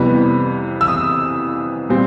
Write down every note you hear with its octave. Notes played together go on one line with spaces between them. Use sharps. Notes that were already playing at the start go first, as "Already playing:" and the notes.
Already playing: F2 C3 E3 G3 B3 B5
E6
D#6
A#2 G3 C4